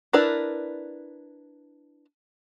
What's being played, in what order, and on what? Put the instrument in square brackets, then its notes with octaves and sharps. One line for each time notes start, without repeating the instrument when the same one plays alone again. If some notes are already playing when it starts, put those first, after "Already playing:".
[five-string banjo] D4 E4 A#4 B4 D5